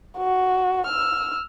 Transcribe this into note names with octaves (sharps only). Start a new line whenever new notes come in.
F#4
E6 F6